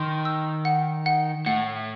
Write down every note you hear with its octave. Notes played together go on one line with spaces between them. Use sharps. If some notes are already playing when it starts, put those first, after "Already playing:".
Already playing: D#3 C6
E6
F#5
F#5
A2 F#5